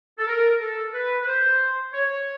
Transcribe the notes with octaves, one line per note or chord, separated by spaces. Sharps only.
A4
A#4
A4
B4
B4
C5
C#5